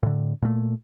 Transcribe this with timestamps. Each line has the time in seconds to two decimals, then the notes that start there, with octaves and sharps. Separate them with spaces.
0.03 A2 D3
0.42 A#2 A3